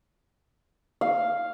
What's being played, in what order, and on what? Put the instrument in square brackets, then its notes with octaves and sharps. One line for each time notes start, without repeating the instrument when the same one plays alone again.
[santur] F5